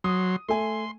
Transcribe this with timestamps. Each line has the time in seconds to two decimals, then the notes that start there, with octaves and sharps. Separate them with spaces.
0.04 F#3 C6 D#6
0.49 A3 A4 G#5 C6